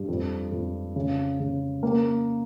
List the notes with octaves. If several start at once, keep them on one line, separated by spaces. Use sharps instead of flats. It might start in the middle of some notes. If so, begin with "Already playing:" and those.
Already playing: G2
F2
F2
C#3
C#3
A#3